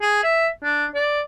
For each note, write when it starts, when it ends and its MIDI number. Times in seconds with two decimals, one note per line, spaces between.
0.01 0.22 68
0.23 0.48 76
0.63 0.86 62
0.95 1.21 74